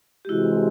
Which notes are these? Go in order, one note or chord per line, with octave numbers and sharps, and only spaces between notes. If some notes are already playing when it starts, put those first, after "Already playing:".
G4
C3 E3 G#3 E4 F#4